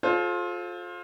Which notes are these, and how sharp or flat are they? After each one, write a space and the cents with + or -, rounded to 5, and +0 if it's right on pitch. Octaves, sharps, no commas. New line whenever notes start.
F4 +20 A4 -30 C5 +25